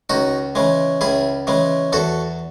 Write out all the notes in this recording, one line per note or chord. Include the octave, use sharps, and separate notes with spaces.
C#2 D#4 F#4
C#3 E3 G#3
C#2 E4 G#4
C#3 E3 G#3
E2 F#4 A4